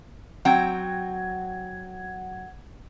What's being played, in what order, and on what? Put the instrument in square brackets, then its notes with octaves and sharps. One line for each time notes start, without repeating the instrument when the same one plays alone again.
[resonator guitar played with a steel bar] F#3 C4 G5 [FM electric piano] F#5 G#6